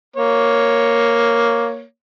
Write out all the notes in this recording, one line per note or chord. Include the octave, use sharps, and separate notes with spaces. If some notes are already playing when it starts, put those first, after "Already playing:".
A#3 C#5